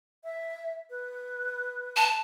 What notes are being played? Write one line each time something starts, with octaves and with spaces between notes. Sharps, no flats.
E5
B4
A5